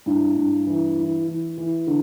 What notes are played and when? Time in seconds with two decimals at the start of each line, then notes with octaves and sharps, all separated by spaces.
0.06 G2 E4
0.37 G2
0.67 E3
0.98 E3
1.28 E3
1.58 E3
1.87 D3